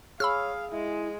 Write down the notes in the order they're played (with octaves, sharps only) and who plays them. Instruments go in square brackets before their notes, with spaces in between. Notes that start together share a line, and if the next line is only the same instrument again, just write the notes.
[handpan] G#4 [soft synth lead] C#5 [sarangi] F5 [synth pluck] B5 E6 F6
[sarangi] G#3 [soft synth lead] E4